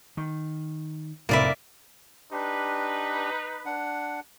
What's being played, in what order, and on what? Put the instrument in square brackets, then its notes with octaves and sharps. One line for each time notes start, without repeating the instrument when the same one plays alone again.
[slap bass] D#3
[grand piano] F1 C2 B5 [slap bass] A2 C3 [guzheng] A#3 D5 E5
[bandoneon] D4 G4 [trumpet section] D#4 B4
[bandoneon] D4 F#5